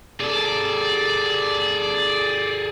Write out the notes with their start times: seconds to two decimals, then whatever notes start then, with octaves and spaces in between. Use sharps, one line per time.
0.20 G#4 A4 D5